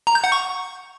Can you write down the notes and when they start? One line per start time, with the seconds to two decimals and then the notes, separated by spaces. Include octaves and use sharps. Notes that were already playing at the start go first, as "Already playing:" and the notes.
0.07 A#5
0.15 G6
0.24 F#5
0.32 C#6